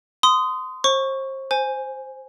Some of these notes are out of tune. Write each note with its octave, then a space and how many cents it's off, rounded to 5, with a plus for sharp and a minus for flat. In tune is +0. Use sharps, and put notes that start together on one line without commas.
C6 -25 D#6 +0
C5 +35 C#6 +0
C5 +0 G#5 +0